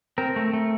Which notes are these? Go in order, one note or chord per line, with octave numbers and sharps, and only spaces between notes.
C4 A#4
A3
A3